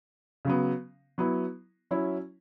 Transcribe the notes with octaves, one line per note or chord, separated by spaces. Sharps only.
C#3 F#3 B3
F#3 B3 E4
F#3 C#4 E4